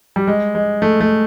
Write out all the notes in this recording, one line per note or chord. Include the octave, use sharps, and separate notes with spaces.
G3
G#3
G#3
A3
A3